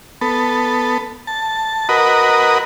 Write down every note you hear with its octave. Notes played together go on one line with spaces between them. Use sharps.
B3 A4
A5
F#4 A#4 B4 D#5